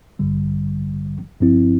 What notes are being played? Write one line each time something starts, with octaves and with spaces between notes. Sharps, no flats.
A1 G2 D3 G3
G1 G2 F3 C4 E4